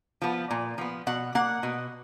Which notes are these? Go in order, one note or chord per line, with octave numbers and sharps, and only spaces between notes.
F3 B3
A#2
F3 B3
B2 F#5
A#3 F#5
B2